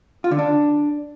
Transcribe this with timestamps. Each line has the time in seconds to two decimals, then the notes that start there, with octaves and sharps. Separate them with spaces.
0.24 F4
0.31 D3
0.39 D4